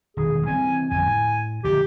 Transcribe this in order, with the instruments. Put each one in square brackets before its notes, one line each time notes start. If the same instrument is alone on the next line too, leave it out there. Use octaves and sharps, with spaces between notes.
[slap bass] E1 D#3 [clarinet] G#4
[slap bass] C2 E3 C4 [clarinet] G#5
[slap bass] G1 F2 [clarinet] G#5
[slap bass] A2
[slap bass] C2 D3 F3 [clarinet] G4